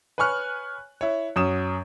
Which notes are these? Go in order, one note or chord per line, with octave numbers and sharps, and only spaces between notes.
B4 C#5 G#5 C#6 F6 F#6
E4 C#5
F#2 C#4 C#5 D#6 E7